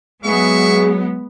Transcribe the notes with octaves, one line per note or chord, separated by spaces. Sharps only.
F#3 G#3 B3 G#4 E5 C#6